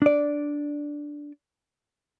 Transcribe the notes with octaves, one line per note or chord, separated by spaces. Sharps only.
D4 D5